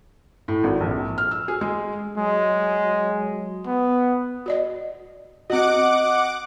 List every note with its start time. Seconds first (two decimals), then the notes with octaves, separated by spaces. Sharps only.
0.48 A2
0.64 G#1
0.81 A#1
1.18 F6
1.31 E6
1.48 G#4
1.61 G#3
2.18 F#3 G#3
3.66 B3
4.46 F#4 D5 D#5
5.50 C4 F#4 D#5 F#5 D6